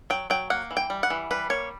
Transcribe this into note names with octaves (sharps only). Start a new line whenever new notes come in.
F#3 G5
F#3 G5
A#3 F#5
E3
G5
G3
F#5
E3
G3 B4
A#3 C#5